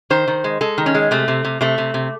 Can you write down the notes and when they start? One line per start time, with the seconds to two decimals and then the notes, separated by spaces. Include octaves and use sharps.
0.10 D#3 C5
0.28 D#3
0.44 G#3
0.61 G#3 A4
0.78 D#3
0.86 C#4
0.94 G#3
1.11 C3 A3
1.28 C3
1.45 C3
1.61 C3 A3
1.78 C3
1.94 C3